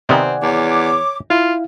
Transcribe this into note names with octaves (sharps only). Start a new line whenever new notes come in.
C3 D#3 B3 C4 D5 F#5 G#5
E2 C#5 D6
E4 F4 F5